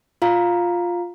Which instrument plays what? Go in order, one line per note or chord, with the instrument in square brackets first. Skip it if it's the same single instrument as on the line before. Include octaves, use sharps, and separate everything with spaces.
[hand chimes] F4 F5 A#5